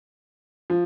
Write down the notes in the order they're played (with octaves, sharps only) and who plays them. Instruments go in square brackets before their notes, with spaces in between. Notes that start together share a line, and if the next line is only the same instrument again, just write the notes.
[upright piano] F3